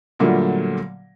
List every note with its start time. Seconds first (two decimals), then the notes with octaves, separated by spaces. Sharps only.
0.19 A#2 D3 F#3 G3 A3 A#3